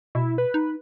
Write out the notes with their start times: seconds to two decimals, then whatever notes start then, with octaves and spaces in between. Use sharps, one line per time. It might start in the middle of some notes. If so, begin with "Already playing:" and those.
0.15 B2 E4
0.38 B4
0.54 D#4